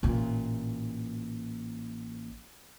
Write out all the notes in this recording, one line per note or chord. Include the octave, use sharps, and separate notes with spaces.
A1 A#2